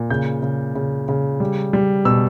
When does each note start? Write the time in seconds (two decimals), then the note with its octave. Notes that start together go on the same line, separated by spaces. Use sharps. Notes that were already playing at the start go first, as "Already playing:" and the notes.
Already playing: A#2
0.10 C#3 G6
0.42 C#3
0.75 C#3
1.08 C#3
1.40 G3
1.73 G3
2.05 B2 E6